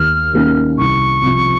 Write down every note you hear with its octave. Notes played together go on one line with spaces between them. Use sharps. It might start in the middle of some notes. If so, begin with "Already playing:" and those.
Already playing: D#2 F6
D#3 A#3 C#4
C2 C#6
C3 F3